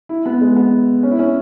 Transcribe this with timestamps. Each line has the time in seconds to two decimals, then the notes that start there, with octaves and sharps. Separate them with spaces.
0.09 E4
0.26 B3
0.41 G#3
0.56 B3
1.03 C#4
1.11 E4
1.19 C#4